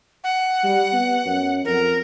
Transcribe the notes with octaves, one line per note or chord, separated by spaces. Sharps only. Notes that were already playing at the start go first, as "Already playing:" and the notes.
F#5
G3
B3
F#2
F2 A#4